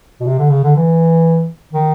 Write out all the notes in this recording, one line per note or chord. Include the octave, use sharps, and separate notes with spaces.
B2
C3
D3
C#3
D3
E3
D#3